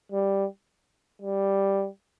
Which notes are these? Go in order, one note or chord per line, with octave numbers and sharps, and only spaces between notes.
G3
G3